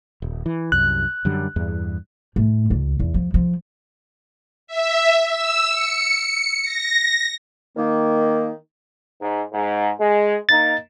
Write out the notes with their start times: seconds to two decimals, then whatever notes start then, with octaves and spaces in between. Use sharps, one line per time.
0.22 D#1
0.46 E3
0.72 C2 F#2 F#6
1.25 F#2 D3 G3
1.56 E2 G2
2.36 A2
2.70 C#2
3.00 E2
3.14 F3
3.34 F3
4.67 E5
5.28 E6
5.70 C#7
6.63 A#6
7.77 D#3 A#3
9.20 G#2
9.52 G#2
9.99 G#3
10.49 A#3 D#4 A6